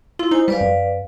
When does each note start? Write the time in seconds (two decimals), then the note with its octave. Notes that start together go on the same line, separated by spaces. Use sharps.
0.19 E4 F4
0.31 D#4 C5 G#5
0.48 G3 B4 D5 F5
0.61 F#2